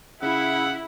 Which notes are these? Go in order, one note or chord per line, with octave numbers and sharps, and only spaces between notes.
C#3 E4 F#5